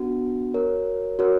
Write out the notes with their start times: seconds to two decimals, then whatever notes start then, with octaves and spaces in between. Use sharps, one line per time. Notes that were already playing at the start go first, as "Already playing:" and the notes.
Already playing: B3 D4 F#4
0.54 F#4 A#4 C#5
1.19 F#4 A#4 C#5